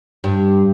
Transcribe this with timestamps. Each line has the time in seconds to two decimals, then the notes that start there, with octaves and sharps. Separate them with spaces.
0.24 G2